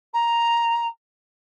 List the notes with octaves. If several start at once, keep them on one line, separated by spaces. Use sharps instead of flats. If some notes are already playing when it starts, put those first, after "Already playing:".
A#5